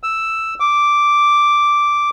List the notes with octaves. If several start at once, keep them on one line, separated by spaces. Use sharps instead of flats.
E6
D6